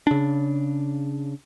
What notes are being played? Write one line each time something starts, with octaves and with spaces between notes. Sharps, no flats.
C#3 D4